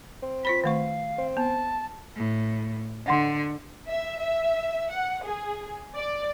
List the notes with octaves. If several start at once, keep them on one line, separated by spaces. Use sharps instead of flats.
C4
F4 C5 B5 B6
D#3 A3 F5 C#6
C4
B3 A5
A2
D3 D#5 F#5 C6
E5
E5
F#5
G#4
D5